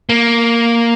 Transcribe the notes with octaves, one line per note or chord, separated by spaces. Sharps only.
A#3